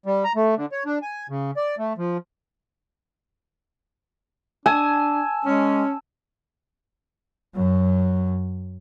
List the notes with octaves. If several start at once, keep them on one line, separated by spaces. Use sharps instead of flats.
G3
A#5
A3
D3
C#5
D4
G#5
C#3
D5
A3
F3
D4 G#5 A5 E6 E7
G#3 C#4
F#2 F#3